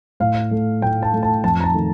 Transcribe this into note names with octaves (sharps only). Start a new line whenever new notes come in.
A2 F5
A3
A2 G5
A5
A3
A5
F2 A5
A#5
A5
D#3 A3